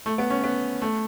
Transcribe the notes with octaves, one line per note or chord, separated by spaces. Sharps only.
A3
B3
C#4
B3
A3